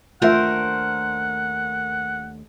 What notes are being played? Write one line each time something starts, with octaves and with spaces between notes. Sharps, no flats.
D#2 A3 D4 F4 A#4 C5 E5 F#5